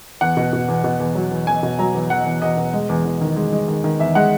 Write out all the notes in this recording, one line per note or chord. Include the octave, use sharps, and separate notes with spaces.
E2 F#5
B2
B2
E2
B2
E2
F#3
E2
E2 G#5
B2
F#3 A#5
E2
E2 F#5
E2
E2 D#5
B2
G#3
E2
E2
D#3
G#3
G#3
D#3
D#3
E2 E5
G#3 F#5